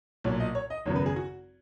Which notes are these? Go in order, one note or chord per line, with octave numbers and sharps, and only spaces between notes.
B1 A#2 F#3 C#5
D#5
C#5
D#5
G#1 F#2 C#3 F#3 B3 C#5
B4
G#4
F#4